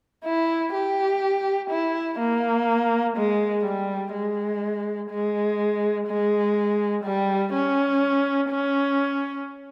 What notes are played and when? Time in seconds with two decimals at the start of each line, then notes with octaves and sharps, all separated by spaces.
0.25 E4
0.74 G4
1.70 E4
2.19 A#3
3.17 G#3
3.64 G3
4.13 G#3
5.10 G#3
6.07 G#3
7.04 G3
7.53 C#4
8.49 C#4